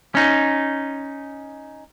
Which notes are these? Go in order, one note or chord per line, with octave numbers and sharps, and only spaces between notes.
C#4 D#4